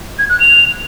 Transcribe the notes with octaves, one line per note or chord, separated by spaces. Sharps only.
G#6
F#6
F7